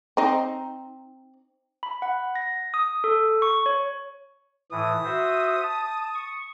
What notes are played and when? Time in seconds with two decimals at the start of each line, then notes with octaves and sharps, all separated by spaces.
0.17 C4 D#4
1.83 B5
2.02 F#5
2.35 A#6
2.74 D#6
3.04 A4
3.42 C#6
3.66 C#5
4.72 A2 E3 D#6
5.04 F#4 C5 E5
5.63 A5
6.15 C#6